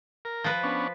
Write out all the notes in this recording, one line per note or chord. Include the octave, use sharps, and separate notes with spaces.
A#4
F3 B4
B3 C#4 D4